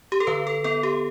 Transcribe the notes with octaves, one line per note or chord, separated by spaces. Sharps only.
G4
A4
D3 B4
A4
B3 A4
G4